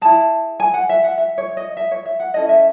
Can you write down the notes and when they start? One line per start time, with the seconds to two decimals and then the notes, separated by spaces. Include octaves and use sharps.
0.01 E4 G#4 A5
0.60 G#5
0.74 F#5
0.89 E5
1.04 F#5
1.18 E5
1.38 C#5
1.57 D#5
1.77 E5
1.91 C#5
2.05 E5
2.20 F#5
2.34 C#4 E4 A4 D#5
2.49 E5